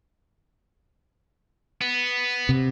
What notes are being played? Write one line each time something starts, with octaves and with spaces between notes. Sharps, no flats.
B3
C3